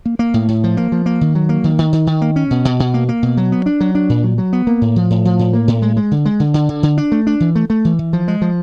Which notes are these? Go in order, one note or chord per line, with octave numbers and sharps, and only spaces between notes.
A#3
A#3
A2
A2
F3
A#3
F3
A#3
D#3
F#3
A#3
D#3
D#3
D#3
D#3
A#3
C#4
B2
B2
B2
A#3
A#3
B2
F#3
B3
D4
F#3
D4
A#2
F#3
F#3
B3
A#3
A2
F3
A2
F3
A2
A#3
A2
G#3
G#3
D3
G#3
D3
D3
D3
D3
D4
A3
D4
E3
A3
A3
E3
E3
F3
G#3
F3